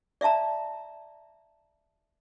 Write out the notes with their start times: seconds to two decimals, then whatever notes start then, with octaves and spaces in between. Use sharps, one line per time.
0.21 D5 E5 F5 A5 A#5